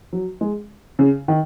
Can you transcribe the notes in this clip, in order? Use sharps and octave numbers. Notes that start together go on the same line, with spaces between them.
F#3
G#3
C#3
D#3